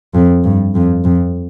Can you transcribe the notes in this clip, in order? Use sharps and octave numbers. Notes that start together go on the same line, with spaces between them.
F2
G2
F2
F2